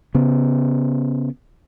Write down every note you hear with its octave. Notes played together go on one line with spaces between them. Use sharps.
C#3 B3